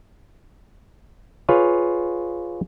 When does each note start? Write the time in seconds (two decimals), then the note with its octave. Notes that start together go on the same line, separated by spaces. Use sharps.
1.49 F4 G#4 B4 C#5 F5